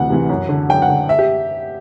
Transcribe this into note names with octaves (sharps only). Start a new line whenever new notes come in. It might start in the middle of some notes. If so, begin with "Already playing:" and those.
Already playing: D2 C3 E3 F#5
C3 E3
F#2
D3
F#2 G5
F#5
D3
E5
G4